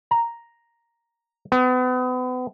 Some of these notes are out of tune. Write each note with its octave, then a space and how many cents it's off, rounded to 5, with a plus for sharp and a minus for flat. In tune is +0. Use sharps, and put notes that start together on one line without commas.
A#5 +0
B3 +35